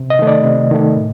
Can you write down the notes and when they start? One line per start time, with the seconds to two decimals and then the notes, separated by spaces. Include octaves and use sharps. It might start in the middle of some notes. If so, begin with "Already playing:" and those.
Already playing: C3
0.10 D#5
0.19 D#3 A3
0.27 D5
0.45 C3
0.71 D#3 A3
0.96 A2